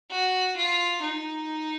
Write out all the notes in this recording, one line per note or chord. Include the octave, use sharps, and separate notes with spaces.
F#4
F4
D#4